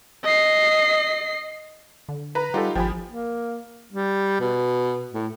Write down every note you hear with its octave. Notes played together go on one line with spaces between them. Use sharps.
D#5 C7
D3
B4 A#5
G3 D#4 F4 G4 A4 F#5
G#1 F3 G4 G5 G#5 B5
A#3
G3
B2
A2